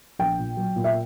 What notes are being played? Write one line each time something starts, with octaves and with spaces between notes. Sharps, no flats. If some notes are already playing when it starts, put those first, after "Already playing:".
A#1 G5
A#2
F#3
A#2
E5